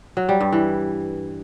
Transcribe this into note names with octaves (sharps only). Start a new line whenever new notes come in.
F#3
G3
G2
E3